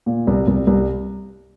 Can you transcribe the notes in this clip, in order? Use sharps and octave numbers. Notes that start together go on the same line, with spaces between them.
A#2
C2
C2
C2